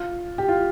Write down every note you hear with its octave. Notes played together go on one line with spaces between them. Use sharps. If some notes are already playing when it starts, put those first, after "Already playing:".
Already playing: F4
G4
F4